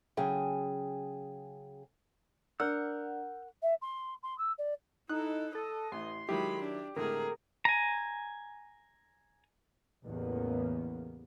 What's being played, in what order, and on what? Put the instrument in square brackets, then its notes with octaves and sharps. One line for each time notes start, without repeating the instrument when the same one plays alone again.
[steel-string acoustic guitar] C#3 F#3 G#4 G5
[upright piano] D4 [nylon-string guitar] A#4 [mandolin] F#5 [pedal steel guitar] E6 F6 G6
[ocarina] E5
C6
C6
E6
D5
[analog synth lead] D#4 [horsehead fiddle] E4 A4 [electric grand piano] F#6
[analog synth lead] A4 [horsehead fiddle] D#5
[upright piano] A1 E3 [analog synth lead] C6
[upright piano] D#3 F#3 E4 [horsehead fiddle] G#3 B5 [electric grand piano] G4
[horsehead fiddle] D4
[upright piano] G#1 A2 D3 [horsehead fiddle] G#4 [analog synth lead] A#4
[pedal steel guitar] G#5 A#5
[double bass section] A1 E2 C#3 A#3 B3